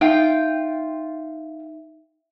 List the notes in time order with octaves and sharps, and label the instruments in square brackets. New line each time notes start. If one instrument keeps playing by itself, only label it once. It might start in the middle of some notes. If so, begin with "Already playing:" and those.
[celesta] D#4 E5 [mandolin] F4 G5